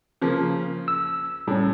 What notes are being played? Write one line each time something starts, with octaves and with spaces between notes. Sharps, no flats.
C#3 F3 A#3
E6
A2 G3 C#4